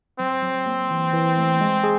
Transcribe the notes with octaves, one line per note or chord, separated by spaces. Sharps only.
F#3 C4
F#3
A#3
E3
E3
A3
G#3
G#4